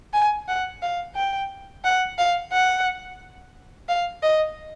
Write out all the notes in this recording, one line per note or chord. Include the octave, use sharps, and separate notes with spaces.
G#5
F#5
F5
G5
F#5
F5
F#5
F5
D#5